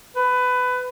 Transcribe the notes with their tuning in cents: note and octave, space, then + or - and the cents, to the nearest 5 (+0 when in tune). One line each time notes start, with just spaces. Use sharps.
B4 +20